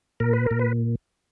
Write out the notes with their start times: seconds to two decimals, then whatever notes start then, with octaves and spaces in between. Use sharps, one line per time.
0.20 A#2 A#4
0.33 B4
0.46 A#2 A#4
0.59 B4